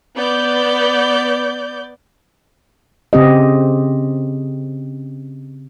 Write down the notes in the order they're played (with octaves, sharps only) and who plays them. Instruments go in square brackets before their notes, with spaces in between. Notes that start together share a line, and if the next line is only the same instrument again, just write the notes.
[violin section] B3 D5 G6
[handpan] C#3 C4 G4 D#5